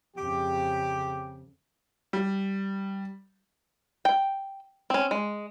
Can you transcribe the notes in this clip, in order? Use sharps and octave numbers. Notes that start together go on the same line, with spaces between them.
F2 C#3 G4
G3
G5
C4 C#4
G#3